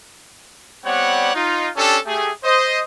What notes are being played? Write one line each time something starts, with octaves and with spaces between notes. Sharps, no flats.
G3 B3 C4 C#5 D5 F#5
D#4 F4
C#4 D4 G4 A4
A3 G4 G#4
C5 D#5